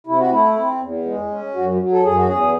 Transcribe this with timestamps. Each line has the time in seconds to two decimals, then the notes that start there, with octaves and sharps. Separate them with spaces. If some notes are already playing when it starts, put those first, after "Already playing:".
0.07 C3 E4
0.19 F#4
0.31 A3 E4
0.57 C4
0.80 E2
1.05 G#3
1.30 C#4
1.54 F#2 F#4
1.79 F#3
1.92 A4
2.04 F#2 G#4
2.16 F#4
2.27 E2 G#4